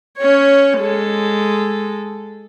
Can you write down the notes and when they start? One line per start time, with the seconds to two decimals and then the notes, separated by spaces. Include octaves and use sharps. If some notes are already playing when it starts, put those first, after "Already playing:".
0.17 C#4 C#5
0.79 G#3 A4